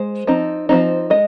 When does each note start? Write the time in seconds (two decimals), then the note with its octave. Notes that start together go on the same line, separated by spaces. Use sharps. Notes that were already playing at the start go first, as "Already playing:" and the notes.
Already playing: G#3 C5
0.27 F3 C4 D#4
0.69 F3 C4 D#4
1.10 G#3 D#5